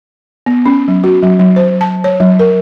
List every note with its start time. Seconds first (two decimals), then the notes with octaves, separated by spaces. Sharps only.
0.46 B3
0.66 C#4
0.88 F#3
1.04 F#4
1.23 F#3
1.39 F#3
1.56 C5
1.81 A5
2.04 C#5
2.20 F#3
2.39 A#4